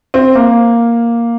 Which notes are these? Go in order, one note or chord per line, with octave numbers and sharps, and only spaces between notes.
C4
A#3